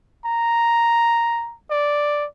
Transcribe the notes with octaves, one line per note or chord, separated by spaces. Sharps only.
A#5
D5